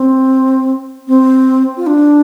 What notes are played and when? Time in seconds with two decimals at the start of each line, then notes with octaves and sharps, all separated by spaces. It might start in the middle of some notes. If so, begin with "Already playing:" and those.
Already playing: C4
1.08 C4
1.77 F4
1.87 D4